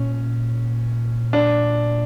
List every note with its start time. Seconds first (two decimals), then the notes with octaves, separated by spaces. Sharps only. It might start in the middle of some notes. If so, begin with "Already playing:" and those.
Already playing: A#2 C#4
1.33 D4